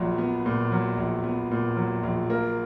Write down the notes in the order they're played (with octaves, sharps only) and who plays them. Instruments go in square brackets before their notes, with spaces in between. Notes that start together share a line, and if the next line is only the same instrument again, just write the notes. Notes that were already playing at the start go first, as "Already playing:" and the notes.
Already playing: [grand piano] A#1 A#2 F#3
B3
A#2
F#3
A#1
B3
A#2
F#3
A#1
A#3